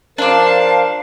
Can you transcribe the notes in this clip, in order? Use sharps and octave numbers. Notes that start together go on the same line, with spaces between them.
F3 D4 A#4 C5 D5 F5 A5